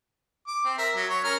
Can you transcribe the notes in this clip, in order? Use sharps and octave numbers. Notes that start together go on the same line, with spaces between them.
D6
C4
A#4 E5
F#3
C#5
C#4 A#4 F6